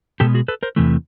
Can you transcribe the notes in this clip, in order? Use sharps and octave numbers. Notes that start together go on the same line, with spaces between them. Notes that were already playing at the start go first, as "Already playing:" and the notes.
B2 G#3 B3 G4 A4
F#4 G#4
A4 B4
A#4 C5
E2 C3 E3 A3